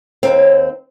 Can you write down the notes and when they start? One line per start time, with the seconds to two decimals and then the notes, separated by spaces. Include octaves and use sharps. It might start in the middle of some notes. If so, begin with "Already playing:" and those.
0.23 D#2 C4